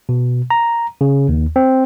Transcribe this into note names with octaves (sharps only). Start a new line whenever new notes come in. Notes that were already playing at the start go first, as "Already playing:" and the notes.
B2
A#5
C#3
D#2
C4